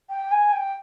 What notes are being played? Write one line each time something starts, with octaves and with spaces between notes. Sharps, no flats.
G5
G#5
G5